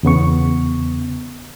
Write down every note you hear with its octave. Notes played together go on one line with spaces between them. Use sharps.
E2 C#3 B3 C#6